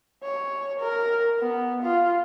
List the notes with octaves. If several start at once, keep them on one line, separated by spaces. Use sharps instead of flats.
C#5
A#4
B3
F4